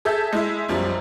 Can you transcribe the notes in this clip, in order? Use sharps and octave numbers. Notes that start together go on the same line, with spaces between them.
G#4 A4 E5 A5 G6 G#6
G#3 E4 E5
B1 F#2 F3 G3